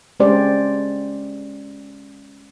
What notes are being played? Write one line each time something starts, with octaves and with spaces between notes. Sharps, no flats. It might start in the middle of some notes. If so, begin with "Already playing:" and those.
G#3 C#4 G4 C5 D5